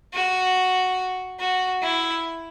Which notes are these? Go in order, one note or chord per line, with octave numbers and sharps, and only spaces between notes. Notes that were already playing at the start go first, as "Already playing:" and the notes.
F#4
F#4
E4